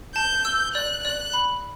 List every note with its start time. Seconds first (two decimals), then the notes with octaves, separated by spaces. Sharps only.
0.15 A5 G6
0.45 E6
0.75 D5 F#6
1.04 D5 F#6
1.33 B5